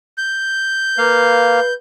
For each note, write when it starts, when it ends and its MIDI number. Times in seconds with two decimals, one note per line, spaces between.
0.18 1.73 91
0.98 1.60 58
0.98 1.75 71
0.98 1.60 77